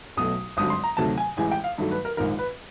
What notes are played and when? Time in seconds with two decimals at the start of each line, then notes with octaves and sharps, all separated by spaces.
0.17 B1 B2 F#3 A3 D#6
0.57 G#1 G2 D3 F#3 D#6
0.70 C6
0.84 A#5
0.97 D2 C3 D#3 F#3 A3 A5
1.18 G#5
1.37 A1 A2 E3 G#3 G#5
1.51 G5
1.64 F5
1.78 G2 D#3 F#3 A3
1.91 B4
2.05 A#4
2.17 A#1 G#2 D#3 A#4
2.38 B4